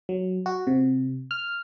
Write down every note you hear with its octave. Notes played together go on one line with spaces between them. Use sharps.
F#3
F#4
C3
F6